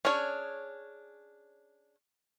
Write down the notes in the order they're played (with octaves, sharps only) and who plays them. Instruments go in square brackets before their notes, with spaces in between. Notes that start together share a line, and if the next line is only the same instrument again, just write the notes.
[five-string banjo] C#4 D4 G#4 C#5